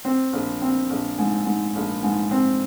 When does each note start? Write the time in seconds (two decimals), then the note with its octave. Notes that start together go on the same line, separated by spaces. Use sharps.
0.05 C4
0.33 A#1
0.62 C4
0.90 A#1
1.18 G#2
1.46 G#2
1.75 A#1
2.03 G#2
2.31 C4